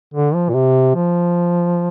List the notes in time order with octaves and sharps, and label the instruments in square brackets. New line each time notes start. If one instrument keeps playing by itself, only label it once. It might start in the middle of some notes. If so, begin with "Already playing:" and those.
[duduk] D3
F3
A#2
C3
F3